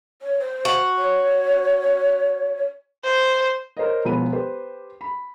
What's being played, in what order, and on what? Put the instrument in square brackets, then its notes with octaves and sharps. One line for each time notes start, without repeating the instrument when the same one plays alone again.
[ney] C#5
C5
[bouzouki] F#4
[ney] C#5
[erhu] C5
[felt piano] A#4 C5 C#5 D#5
E1 F3 B3 G#4 B5 D#7
G4 B4 C5
B5